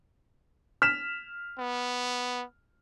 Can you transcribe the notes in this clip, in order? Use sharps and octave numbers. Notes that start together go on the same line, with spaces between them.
F6 B6 E7
B3